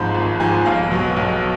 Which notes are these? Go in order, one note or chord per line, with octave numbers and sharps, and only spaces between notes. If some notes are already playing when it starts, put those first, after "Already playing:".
Already playing: G#1 G#2 F3 B5
G#1
G#2 F3 G#5
B1 F5
B2 F#3
B1